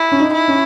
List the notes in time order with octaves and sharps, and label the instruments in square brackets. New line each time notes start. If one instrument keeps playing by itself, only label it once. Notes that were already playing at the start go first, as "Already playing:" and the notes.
Already playing: [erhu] E4
[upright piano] C#4
D#4
[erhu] E4
[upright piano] C#4